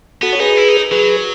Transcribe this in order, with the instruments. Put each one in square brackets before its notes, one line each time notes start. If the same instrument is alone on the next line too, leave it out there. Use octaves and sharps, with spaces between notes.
[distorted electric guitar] B3 [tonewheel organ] F#4 A4
[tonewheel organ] C#5
[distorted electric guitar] D#4 [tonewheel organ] G#4 B4
[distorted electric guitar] E4
D#4
[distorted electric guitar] F#3 [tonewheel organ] G#4 B4